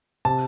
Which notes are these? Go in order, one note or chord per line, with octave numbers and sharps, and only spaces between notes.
C3 A5